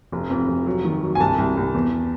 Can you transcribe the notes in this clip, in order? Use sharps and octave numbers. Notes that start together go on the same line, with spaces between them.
F1
F2
F1
F#3
D#3
F#3
G#5
C2 A5
C2
C2
E2